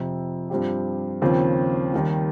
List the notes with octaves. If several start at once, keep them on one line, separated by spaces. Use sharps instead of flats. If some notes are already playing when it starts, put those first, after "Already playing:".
Already playing: F2 C3 F3
G2 F3 C4 G4
D#2 C#3 F3 C4
D#2 D#3 G3